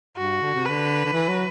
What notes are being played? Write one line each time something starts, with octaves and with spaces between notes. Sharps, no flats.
G2 F#4
D3
C3
D3 B4
D3
E3
F#3